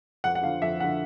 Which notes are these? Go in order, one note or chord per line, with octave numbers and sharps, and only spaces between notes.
F2 F#5
F#5
D3 F3 F5
F2 E5
D3 F3 F#5